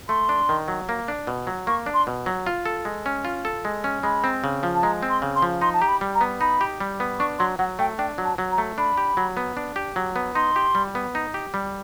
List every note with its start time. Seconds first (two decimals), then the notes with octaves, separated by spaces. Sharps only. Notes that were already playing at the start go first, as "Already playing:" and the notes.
0.09 A3 C6
0.29 D4
0.49 D#3
0.68 F#3
0.89 A#3
1.08 D4
1.27 B2
1.47 F#3
1.67 A#3 C#6
1.86 D4
1.94 C6
2.07 B2
2.26 F#3
2.47 F4
2.66 A4
2.85 G#3
3.06 C#4
3.25 F4
3.45 A4
3.65 G#3
3.84 C#4
4.03 G#3 B5
4.24 C4
4.44 C#3
4.63 F3
4.75 A5
4.83 G#3 A#5
5.03 C4
5.09 C6
5.22 C#3
5.36 C6
5.42 F3
5.61 D#4 C6
5.74 A5
5.81 G4 A#5
5.88 B5
6.01 G3
6.15 A#5
6.21 B3
6.41 D#4 B5
6.61 G4
6.80 G3
7.00 B3
7.19 D4 C#6
7.39 F#3 C6
7.59 F#3 F#5
7.79 A3 G5
7.98 D4 G5
8.18 F#3
8.24 A5
8.38 F#3
8.52 A#5
8.58 A3
8.78 D4 B5
8.97 G4
9.17 F#3
9.37 B3
9.57 D4
9.76 G4
9.96 F#3
10.16 B3
10.35 D#4 C6
10.56 G4
10.75 G3
10.95 B3
11.15 D#4
11.34 G4
11.54 G3